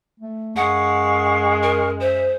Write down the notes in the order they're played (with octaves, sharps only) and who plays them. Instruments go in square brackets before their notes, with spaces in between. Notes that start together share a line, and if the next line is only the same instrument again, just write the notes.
[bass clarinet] A3
[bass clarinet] F#2 [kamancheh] G#3 [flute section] F5 C#6 D#6 [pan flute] F#5
[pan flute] A#4
[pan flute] C5 [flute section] E5